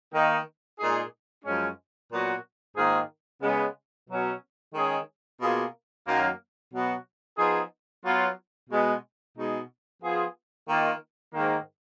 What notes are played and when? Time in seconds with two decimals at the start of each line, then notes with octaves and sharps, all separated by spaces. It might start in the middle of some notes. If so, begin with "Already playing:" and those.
0.13 D#3 A#3 D#4
0.79 A#2 G#3 D#4 G#4
1.45 F#2 F3 G#3 C#4
2.10 A#2 F#3 B3 F#4
2.76 G#2 D#3 A#3 F4 G#4
3.42 C#3 G#3 B3
4.08 B2 F#3 C#4
4.74 D#3 G#3 C#4 G#4
5.40 B2 A#3 F4 G#4
6.07 F#2 D#3 F#3 A#3
6.72 B2 F#3 B3 F#4
7.37 F3 B3 D#4 G#4
8.04 F#3 B3 F4
8.70 B2 G#3 B3
9.36 B2 G#3 D#4 G#4
10.01 F3 B3 F4 G#4
10.67 D#3 A#3 F4
11.34 G#2 D#3 A#3